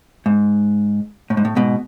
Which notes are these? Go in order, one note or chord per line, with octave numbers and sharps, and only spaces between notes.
G#2
A2
G#2
A2
G#2 B2